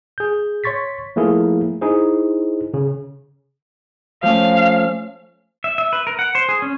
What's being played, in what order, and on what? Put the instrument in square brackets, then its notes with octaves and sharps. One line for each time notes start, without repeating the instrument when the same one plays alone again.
[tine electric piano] G#4 G6
C#5 C6 C#6 A6 B6
F3 A3 A#3 E4 G#4 A#4
D#4 E4 G#4 C5
C#3
[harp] F3 A3 C#4 [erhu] F5
[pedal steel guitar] E5
E5
B4
A#4
F#5
C5
G#4
C#4